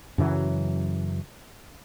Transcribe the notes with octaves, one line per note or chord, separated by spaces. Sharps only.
F#2 C#3 E3 F#3